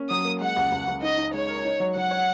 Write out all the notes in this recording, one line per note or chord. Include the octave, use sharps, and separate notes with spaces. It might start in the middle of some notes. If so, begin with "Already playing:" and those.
Already playing: A#3 C#4
F#3 D#6
A#3
G#3 F#5
C#2
C#2
C#2
D#4 D#5
D#4
G#3 C#5
A#4
D#4
F#3
F#3 F#5
C#5